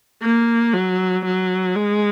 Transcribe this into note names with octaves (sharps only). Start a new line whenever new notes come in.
A#3
F#3
F#3
G#3